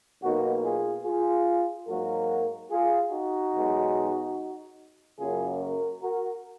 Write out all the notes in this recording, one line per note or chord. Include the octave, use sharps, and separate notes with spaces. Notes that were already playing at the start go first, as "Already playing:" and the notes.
B1 B2 A#3 D#4 F#4
F4 G#4
F4 G#4
G#2 F#3 A#3 F#4 A#4
F4 G#4
D#4 F#4
B1 B2 G#3
F#2 C#3 F#3 A#3 F4 G#4
F#4 A#4
F#4 A#4